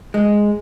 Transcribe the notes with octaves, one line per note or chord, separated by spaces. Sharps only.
G#3